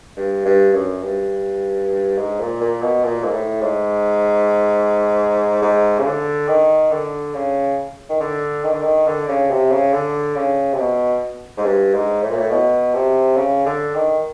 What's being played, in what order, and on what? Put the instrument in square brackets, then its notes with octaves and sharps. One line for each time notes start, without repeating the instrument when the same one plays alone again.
[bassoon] G2
G2
F#2
G2
G#2
A#2
A#2
B2
A#2
G#2
A2
G#2
G#2
C#3
D3
D#3
D3
C#3
D#3
D3
D#3
D3
D#3
D3
C#3
C3
C#3
D3
C#3
C3
B2
G#2
G2
G#2
A2
A#2
A2
B2
C3
C#3
D3
D#3